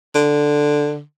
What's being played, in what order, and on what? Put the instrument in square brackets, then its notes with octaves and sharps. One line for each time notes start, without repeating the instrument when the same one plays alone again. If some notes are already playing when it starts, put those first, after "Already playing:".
[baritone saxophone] D3